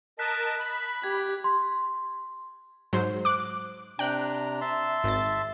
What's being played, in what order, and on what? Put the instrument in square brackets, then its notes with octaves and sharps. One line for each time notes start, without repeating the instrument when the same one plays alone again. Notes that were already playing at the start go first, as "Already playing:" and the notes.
[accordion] A#4 D#5 A5 [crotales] F#6 B6
[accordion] B5
[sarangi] G4 [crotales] G#6
[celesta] C6
[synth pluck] G#2 F#3 C5
D6 F#6
[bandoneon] C3 D4 A#5 [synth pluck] G5 F#6
[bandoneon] E5 A5 C6
[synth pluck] G#1 A6